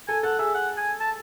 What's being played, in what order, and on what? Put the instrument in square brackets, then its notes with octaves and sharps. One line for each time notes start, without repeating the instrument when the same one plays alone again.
[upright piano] A4 [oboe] G#5
[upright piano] A4 [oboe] F#5
[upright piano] G#4 [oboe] E5
[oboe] F#5
G#5
A5